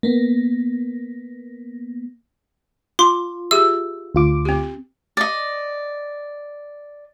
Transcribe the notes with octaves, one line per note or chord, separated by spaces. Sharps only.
A#3 B3
F4 C6 D6
G4 G#4 E5 E6
D2 F4 D6
C4 G4
D5 D#5